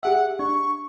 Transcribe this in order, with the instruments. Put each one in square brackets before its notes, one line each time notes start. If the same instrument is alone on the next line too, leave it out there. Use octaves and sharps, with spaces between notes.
[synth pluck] G4 G#4 E5 [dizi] F#5
[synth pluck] D4 [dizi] C#6